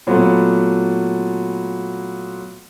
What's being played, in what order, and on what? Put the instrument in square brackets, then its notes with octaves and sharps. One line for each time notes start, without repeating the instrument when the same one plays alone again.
[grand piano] A#2 F#3 A3 B3